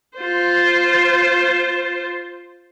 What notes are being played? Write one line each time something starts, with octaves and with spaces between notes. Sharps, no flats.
F4 C5